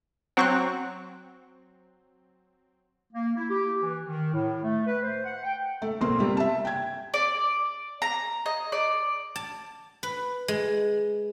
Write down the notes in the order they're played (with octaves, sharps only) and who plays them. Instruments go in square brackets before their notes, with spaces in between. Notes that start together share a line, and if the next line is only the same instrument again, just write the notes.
[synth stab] F#3 C4 [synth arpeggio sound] F#5 C#6 F#6
[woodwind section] A#3
E4
G4
E3
D#3
A2
A3
B4
C5
F#5
G5
[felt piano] A3
A#1 B2 A#3 C4 C6
C3 G3
E5 A5
G5 G#6
[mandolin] D5
A#5
D#5
D5
[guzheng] A5
B4
G#3